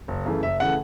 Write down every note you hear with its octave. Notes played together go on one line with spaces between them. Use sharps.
F#1
F#2 C#3 E3 A3
F#1 E5
C#3 E3 A3 F#5